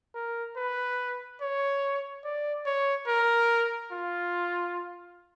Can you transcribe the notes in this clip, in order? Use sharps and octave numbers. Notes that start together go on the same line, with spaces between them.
A#4
B4
C#5
D5
C#5
A#4
F4